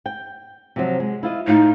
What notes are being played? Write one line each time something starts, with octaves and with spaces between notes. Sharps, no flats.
G5
C3 F3 F#3
G#3
E4 F4 D#5
A2 D#4 F4